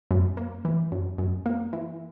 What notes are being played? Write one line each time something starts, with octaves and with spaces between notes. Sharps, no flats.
F#2
A#3
E3
F#2
F#2
A#3
E3